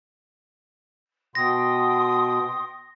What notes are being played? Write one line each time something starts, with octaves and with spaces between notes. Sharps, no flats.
B2 G5 C6 D#6 A#6